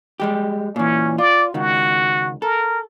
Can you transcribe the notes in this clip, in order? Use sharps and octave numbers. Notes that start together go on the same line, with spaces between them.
G3 G#3 G4
A#2 E3 C#4
F4 D5
C#2 D#3 F#4
A4 A#4